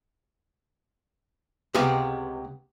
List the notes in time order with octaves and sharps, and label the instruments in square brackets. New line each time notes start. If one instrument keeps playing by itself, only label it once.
[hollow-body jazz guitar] C#2 C3 G#3 B3 G4 F5